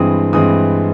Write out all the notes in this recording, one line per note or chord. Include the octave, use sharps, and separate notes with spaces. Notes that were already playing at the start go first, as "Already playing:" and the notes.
Already playing: G2 E3 G#3 C4 D#6
G2 E3 G#3 C4 D#6